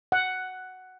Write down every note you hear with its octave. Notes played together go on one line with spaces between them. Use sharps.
F#5